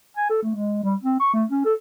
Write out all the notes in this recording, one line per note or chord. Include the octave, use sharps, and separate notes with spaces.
G#5
A4
A3
G#3
G3
C4
C#6
A3
C#4
A4